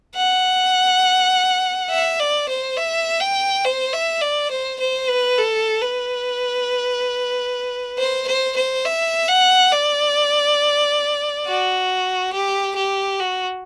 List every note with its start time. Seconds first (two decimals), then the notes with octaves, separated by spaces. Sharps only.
0.16 F#5
1.90 E5
2.20 D5
2.49 C5
2.77 E5
3.20 G5
3.65 C5
3.93 E5
4.21 D5
4.51 C5
4.80 C5
5.09 B4
5.38 A4
5.81 B4
7.99 C5
8.28 C5
8.56 C5
8.86 E5
9.28 F#5
9.72 D5
11.46 F#4
12.33 G4
12.76 G4
13.20 F#4